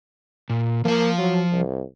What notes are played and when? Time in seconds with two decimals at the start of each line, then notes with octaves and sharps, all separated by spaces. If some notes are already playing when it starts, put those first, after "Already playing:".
0.50 A#2
0.85 F3 A#3 F5
1.18 F#3
1.52 C2